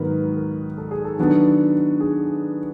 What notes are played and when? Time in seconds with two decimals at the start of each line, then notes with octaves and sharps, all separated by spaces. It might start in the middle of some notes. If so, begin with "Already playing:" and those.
Already playing: G#2 D#3 F#3 B3 A#4 B4
0.36 A#4
0.78 A4
0.91 G#4
1.04 A4
1.18 D#3 F#3 B3 D4
2.00 G#4